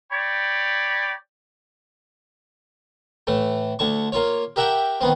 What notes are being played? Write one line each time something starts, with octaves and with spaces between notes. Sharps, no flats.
C#5 D5 G5 B5
A2 E3 A3
D2 D3 A5 C#6
A#3 F4 C#5
G4 A#4 E5 F#5 G5 A5
D#3 B3 C4